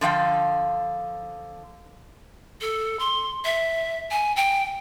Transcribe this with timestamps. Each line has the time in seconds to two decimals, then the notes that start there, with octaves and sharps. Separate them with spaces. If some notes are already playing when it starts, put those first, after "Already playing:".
0.01 D3 F3 F5 G5
2.61 A4
2.99 C6
3.44 E5
4.11 G#5
4.36 G5